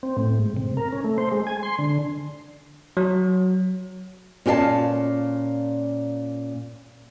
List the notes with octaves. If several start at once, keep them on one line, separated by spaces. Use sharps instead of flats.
C4
A2
G#2
C3
A#4
C#4
A3
C5
G#3
G#5
C6
D3
F#3
A#2 C#4 G4 D5 F5 A5